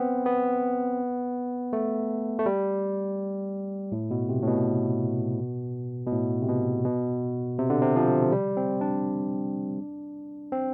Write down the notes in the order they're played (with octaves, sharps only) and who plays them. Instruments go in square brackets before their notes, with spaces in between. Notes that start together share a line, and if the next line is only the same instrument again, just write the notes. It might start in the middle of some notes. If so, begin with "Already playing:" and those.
Already playing: [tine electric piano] B3 C4
B3
A3
A3
G3
A2
B2
C3
A2
B2
B2
A2
C3
B2
B2
C3
D3
C3
F3
G3
C4
D4
C4